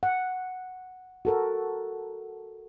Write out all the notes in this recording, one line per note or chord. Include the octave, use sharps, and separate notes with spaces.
F#5
F#4 A4 A#4